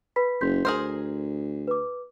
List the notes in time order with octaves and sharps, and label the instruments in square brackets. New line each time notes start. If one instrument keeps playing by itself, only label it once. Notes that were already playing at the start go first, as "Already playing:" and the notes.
[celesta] B4 B5 B6
[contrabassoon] F#1 [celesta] C6 G6 B6
[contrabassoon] D2 [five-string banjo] G#4 A#4 C5
[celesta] B4 D6